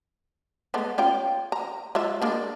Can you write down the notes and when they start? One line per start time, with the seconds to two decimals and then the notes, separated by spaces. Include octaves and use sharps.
0.74 G#3 A3 B3
0.98 C#4 F4 G5
1.52 A#5
1.95 G#3 F4 E5
2.22 G#3 A#3 D4